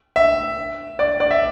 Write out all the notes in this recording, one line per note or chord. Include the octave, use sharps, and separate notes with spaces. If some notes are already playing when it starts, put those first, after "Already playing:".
E5
D5
D5
E5